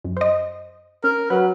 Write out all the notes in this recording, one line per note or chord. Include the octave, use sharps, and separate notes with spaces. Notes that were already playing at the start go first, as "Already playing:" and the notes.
F#2
C5 D#5
C#4 A#4
F#3 B4